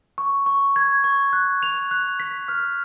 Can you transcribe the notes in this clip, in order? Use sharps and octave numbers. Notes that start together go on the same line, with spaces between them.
C#6
C#6
G#6
C#6
F#6
F7
F#6
B6
F6